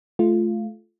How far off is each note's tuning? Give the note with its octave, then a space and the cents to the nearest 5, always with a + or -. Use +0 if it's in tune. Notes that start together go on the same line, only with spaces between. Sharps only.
A3 -25 F4 -10